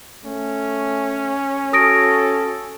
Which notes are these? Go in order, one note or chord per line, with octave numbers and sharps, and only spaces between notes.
A3 C#4
F#4 A4 D#6 A#6 D7